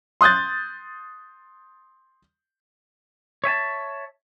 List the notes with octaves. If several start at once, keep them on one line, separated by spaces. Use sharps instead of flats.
C6 D#6 F#6 G6 A6
C#5 E5 G#5 A5